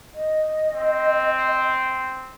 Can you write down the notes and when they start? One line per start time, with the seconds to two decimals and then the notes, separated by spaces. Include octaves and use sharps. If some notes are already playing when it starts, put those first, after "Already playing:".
0.15 D#5
0.74 C4